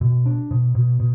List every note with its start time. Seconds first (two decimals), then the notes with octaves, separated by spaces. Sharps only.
0.01 B2
0.26 D4
0.51 B2
0.75 B2
1.00 B2